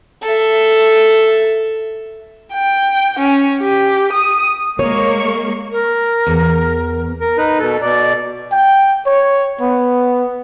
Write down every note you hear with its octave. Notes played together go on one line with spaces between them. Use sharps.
A4 E5
G5
C#4
G4
D#6
G#3 A#3 C#5 C#6
A#4
E2
A#4
D#4 B4
B2 A4
B2 D5
G5
C#5
B3